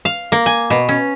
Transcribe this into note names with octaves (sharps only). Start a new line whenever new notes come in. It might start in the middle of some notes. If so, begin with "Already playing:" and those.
F5
A#3
G#5
B2
C#4